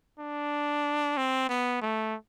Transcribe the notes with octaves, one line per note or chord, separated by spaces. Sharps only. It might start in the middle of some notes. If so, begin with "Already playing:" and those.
D4
C4
B3
A3